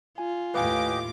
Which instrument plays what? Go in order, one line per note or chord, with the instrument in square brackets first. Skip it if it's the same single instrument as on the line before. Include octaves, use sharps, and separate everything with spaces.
[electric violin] F4 [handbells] G#5
[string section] D#2 A2 D6 [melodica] G4 D#5 [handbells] B4 F5 G#5